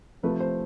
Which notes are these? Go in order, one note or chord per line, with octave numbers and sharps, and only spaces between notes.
C3 F3 A3 B4
C5